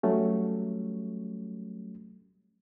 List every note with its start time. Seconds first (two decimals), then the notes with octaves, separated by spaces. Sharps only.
0.03 F#3 G3 A3 C#4